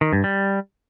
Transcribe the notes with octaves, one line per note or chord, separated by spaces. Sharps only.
D#3
G2
G3